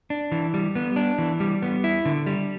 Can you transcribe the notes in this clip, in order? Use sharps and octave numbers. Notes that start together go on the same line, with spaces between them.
D4
E3
G3
B3
D4
E3
G3
B3
E4
D3
G3